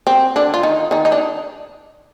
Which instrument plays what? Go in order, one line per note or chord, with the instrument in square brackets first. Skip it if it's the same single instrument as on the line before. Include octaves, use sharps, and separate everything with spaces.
[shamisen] C4
D3 D4
F4
D#3 D#4
D#3 D#4
D#4
D4